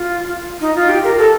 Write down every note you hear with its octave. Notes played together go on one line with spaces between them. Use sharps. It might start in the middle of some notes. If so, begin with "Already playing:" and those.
Already playing: F4
D#4
F4
G4
A#4
A4